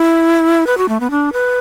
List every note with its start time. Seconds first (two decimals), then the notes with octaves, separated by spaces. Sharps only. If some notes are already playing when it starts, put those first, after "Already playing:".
Already playing: E4
0.67 B4
0.78 F#4
0.89 A3
1.00 B3
1.11 D4
1.33 B4